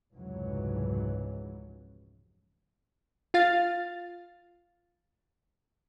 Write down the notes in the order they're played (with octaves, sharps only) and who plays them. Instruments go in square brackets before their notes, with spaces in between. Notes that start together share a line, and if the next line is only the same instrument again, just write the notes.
[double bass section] F1 C#2 G#2 E3 F#3
[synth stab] F4 F5 A6